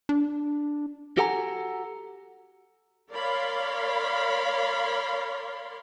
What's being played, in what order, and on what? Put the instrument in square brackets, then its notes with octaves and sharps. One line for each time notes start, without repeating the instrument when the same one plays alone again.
[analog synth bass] D4
[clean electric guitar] F#4 G4 A4 F#5 G#5 A#5
[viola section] A#4 C#5 D5 F5 B5 C6